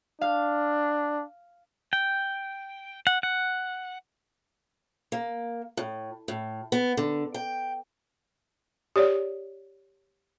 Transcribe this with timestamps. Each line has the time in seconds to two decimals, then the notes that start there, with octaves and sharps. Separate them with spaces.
0.21 D4 F5
1.93 G5
3.07 F#5
3.23 F#5
5.12 A#3
5.77 A2
6.28 A2
6.72 B3
6.97 D3
7.34 G5
8.96 G4 C#5 D5